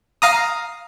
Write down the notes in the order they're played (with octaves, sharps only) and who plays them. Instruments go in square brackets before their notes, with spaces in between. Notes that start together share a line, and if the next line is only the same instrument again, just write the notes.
[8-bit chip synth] F5 A#5 D#6